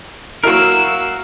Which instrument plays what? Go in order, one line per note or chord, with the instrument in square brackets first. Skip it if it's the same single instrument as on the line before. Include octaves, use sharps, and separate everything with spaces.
[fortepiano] F#3 A#3 E4 [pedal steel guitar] F#4 A#4 [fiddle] F5 E6